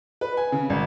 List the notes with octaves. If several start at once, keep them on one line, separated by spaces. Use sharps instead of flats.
B4
G#5
C#3
G#1